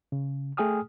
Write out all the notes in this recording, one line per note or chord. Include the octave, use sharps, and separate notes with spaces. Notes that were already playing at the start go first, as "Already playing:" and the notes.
C#3
A3 G#4 G5 G#5 D#6 F6